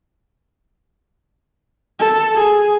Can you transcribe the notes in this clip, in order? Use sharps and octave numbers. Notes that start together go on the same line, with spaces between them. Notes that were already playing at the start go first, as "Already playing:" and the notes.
A4
G#4